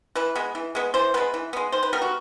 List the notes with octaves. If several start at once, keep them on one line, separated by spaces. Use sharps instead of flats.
E3 B4
G#3 B3
E3
G#3 B3
E3 C5
G#3 B3 B4
E3
G#3 B3
D#3 C5
B4
G3 B3 A#4
F#4